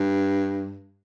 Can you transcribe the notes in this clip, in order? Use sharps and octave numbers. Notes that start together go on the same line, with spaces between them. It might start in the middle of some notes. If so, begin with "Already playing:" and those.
Already playing: G2